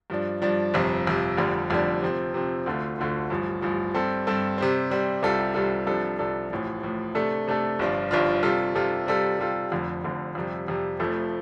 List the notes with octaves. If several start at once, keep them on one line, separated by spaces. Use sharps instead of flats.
G2 F3 D4
G2 F3 D4
G1 F2 C3
G1 F2 C3
F1 F2 D3 G3 D4
F1 F2 D3 G3 D4
C3 F3 C4
C3 F3 C4
D2 D3 A3 F4
D2 D3 A3 F4
A1 G2 F3
A1 G2 F3
G2 G3 C4 A4
G2 G3 C4 A4
C3 G3 C4
C3 G3 C4
C2 C3 G3 F4 A4
C2 C3 G3 F4 A4
C2 C3 F3 D4 A4
C2 C3 F3 D4 A4
A1 A2 F3
A1 A2 F3
C3 A3 D4 A4
C3 A3 D4 A4
G1 G2 F3 D4 F4
G1 G2 F3 D4 F4
C3 G3 F4 A4
C3 G3 F4 A4
C3 G3 F4 A4
C3 G3 F4 A4
F1 F2 D3
F1 F2 D3
F2 C3 G3
F2 C3 G3
F1 F2 F3 A3